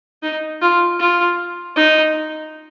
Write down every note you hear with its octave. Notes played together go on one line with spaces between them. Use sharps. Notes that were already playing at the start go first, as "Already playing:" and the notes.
D#4
F4
F4
D#4